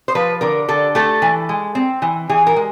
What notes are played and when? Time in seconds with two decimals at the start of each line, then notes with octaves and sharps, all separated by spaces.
0.08 C5
0.15 F3 B4
0.41 D3 A#4
0.68 D3 A4
0.95 A3 A4
1.22 E3
1.49 G#3
1.75 C4
2.02 E3
2.29 E3 G#4
2.47 A#4
2.56 G#3